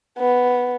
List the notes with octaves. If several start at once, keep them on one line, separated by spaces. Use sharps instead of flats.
B3